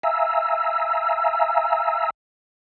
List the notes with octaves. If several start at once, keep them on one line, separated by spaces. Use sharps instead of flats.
E5 F5 G#5 A#5 E6